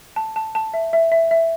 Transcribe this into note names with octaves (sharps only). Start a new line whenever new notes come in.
A5
A5
A5
E5
E5
E5
E5